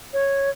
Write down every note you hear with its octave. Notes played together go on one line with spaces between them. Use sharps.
C#5